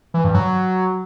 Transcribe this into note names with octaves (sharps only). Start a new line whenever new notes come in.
E3
G2
F#3
F#3